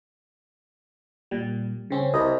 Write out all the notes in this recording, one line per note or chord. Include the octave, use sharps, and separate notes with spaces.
A#2 G3
C#3 C4 C#4
C2 D#5